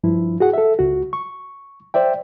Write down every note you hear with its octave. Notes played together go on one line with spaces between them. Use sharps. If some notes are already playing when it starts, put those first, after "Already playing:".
G2 F3 E4
F#4 G#4 F#5
A4 E5
C#2 F#4
C#6
C5 D5 E5 G5